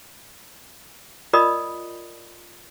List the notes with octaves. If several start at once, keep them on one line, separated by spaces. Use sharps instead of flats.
F4 A#4 D5 D#5 B5 D#6